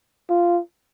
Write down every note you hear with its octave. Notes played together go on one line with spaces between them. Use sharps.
F4